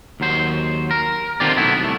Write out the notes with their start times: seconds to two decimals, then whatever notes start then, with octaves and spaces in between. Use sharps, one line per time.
0.20 D#2 F#3 C5
0.91 A#4
1.40 D3 D#3 C4 F4 G4 D5
1.57 B1 A3 B3 E4
1.80 C2 A3